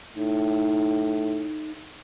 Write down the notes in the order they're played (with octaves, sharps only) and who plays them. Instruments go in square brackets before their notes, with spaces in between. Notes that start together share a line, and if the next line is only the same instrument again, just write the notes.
[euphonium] A2 [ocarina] D#4